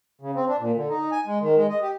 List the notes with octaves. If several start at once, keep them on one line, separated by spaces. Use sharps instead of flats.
C#3
C4
D4
A#2
D3
D#4
G#5
G#3
D#3
G#3
D#5
G4